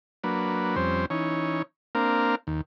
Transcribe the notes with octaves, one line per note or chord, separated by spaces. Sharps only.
F#3 A#3 D4 B4
F2 G3 C4 C#4 C5
E3 C#4 D#4 C#5
A#3 C4 D4 A#4 F5
D#2